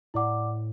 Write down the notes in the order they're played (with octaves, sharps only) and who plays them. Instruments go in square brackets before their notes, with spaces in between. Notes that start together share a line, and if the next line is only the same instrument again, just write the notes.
[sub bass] A2 [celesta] E4 D5 F#5 D6